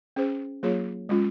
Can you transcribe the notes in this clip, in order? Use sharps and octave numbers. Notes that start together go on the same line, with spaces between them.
C#4 G#4 C5
F#3 A#3 F4 G#4 C#5
G#3 C#4 F4